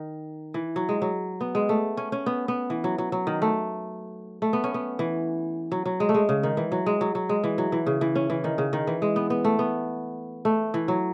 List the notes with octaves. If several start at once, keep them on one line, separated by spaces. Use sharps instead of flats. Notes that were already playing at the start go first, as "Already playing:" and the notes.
Already playing: D#3
E3
F#3
G#3
F#3
B3
G#3
A3
C#4
C#4
B3
B3
E3
F#3
F#3
F#3
D#3
A3
A3
B3
C#4
B3
E3
F#3
F#3
G#3
A3
G#3
C#3
D#3
E3
F#3
G#3
F#3
F#3
G#3
E3
F#3
E3
C#3
E3
C#4
E3
D#3
C#3
D#3
E3
G#3
B3
B3
A3
B3
A3
E3
F#3